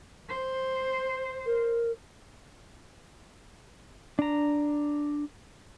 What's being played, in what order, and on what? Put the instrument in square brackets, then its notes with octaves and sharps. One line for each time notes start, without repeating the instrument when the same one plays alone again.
[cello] C5
[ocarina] A#4
[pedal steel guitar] D4 A#5